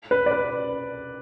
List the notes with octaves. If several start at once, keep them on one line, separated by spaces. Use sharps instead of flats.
B4
D5
B4